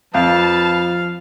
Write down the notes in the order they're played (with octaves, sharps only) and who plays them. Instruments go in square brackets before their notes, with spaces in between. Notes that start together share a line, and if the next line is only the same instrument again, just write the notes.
[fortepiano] F2 [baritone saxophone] F3 [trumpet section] B4 A5 [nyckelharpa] F5